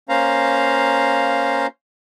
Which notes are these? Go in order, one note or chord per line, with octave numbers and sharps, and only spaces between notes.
A#3 C#4 C5 F5 A#5